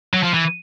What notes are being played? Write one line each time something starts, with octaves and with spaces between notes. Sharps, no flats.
F#3
F3
E3